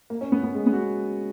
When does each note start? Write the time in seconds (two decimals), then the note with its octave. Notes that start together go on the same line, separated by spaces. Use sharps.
0.10 A#3
0.21 C#4
0.32 B3
0.43 B3
0.55 G#3
0.66 B3
0.73 F#4